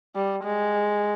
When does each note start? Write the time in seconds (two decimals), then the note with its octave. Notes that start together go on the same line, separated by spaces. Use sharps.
0.16 G3
0.44 G#3